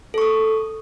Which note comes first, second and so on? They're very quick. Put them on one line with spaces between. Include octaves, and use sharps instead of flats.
A4 C#6 D#6